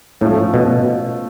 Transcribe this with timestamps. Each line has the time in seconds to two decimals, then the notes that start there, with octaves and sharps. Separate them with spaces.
0.21 A2 F3 A3 C#4
0.54 B2